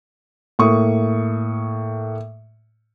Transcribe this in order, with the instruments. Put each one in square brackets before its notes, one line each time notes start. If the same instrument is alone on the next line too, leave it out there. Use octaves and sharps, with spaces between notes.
[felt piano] A2 A#3 C#6 D#6